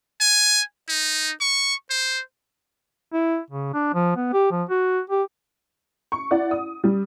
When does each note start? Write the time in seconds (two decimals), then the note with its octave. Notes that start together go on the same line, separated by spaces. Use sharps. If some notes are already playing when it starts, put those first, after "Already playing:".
0.21 G#5
0.89 D#4
1.41 C#6
1.90 C5
3.13 E4
3.50 C#3
3.74 D4
3.94 F3
4.16 B3
4.33 G4
4.51 F3
4.70 F#4
5.10 G4
6.12 C#6
6.31 E4 D5 F#5
6.51 D#6
6.84 G3